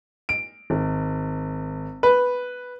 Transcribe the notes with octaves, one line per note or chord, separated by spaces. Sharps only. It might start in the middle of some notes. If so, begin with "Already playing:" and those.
D7
G#1
B4